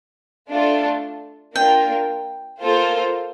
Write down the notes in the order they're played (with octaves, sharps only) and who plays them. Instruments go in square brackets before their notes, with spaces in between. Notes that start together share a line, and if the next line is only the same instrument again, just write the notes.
[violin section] A3 D4 F4 A4
[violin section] A#3 D4 F4 A#4 [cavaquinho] G5
[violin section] A#3 F4 A4 C5